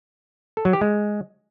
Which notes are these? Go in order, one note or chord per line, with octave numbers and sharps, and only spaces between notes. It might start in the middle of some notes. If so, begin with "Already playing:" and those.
A4
F#3
G4
G#3